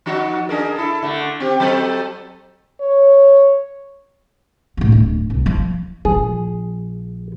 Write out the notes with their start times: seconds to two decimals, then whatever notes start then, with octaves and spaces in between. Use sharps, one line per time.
0.06 F3 D#4 F#4
0.49 D4 G#4 A#4
0.76 E4 A4
1.03 D3 A3
1.40 C4 G4
1.60 F#3 C4 A4
2.81 C#5
4.77 A2 F#3
4.92 D1
5.30 C2
5.46 F3
6.05 A#1 F3 G#4